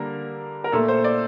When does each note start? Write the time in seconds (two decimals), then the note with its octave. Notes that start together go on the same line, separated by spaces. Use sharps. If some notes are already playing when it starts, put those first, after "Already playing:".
Already playing: D3 G3 A#3 A#4
0.64 A#4
0.72 A#2 A3 A4
0.88 C5
1.04 D5